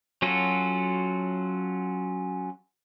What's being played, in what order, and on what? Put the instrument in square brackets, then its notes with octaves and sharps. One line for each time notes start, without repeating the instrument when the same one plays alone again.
[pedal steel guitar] F#3 C#4 F4 F#4 A4